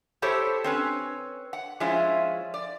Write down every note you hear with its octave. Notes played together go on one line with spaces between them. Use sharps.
E4 G4 A4 C5 C#5
C4 C#4 B4
F#5
F3 G#3 C#4 E4 F4
D5